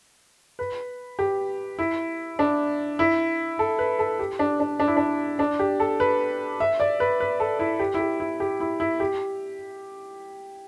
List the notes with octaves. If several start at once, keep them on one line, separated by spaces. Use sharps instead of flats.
B4
G4
E4
D4
E4
A4
B4
A4
G4
D4
D4
D4
E4
D4
D4
G4
A4
B4
E5
D5
B4
B4
A4
E4
G4
E4
G4
E4
G4
E4
E4
G4